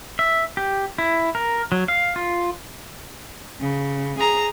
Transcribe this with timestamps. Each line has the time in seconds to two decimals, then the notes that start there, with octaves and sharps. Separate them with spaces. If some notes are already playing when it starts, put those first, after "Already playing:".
0.19 E5
0.57 G4
0.98 E4
1.35 A#4
1.72 F#3
1.88 F5
2.16 F4
3.61 C#3
4.19 G#4 A#5